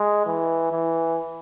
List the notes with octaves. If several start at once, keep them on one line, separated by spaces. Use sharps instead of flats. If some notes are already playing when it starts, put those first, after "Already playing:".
Already playing: G#3
E3
E3